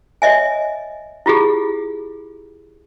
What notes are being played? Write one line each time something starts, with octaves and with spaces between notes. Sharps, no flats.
C#5 D#5 E5 G#5
E4 F4 G4 G#4